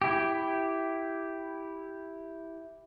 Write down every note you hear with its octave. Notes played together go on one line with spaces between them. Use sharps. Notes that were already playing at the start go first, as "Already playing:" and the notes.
E4 G4